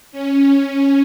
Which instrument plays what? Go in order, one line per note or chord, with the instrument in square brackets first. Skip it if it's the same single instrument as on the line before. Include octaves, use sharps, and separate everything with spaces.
[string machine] C#4